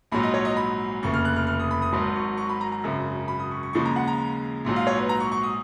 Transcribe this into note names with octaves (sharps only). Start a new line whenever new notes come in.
A#1 G#2 F#3 B5
D#5
C#5
D#5
B5
F1 D#2 C#3 C#6
F6
F#6
F6
F6
D#6
B5
D#6
G#1 G#2 F#3 B5
C#6
C#6
B5
A#5
A#5
G#1 F#2 C#3
B5
D#6
C#6
C#6
D#2 C#3 F3 G#3 C#6
A#5
F#5
A#5
A#1 G#2 F#3
F5
C#5
B4
A#5
C#6
C#6
D#6